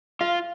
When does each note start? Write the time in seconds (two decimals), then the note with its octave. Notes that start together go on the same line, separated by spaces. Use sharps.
0.21 F4 F5